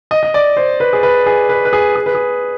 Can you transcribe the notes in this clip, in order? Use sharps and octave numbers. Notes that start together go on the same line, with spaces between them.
D#5
D#5
D5
C5
B4
G#4
B4
G#4
B4
B4
G#4
G#4
B4
G#4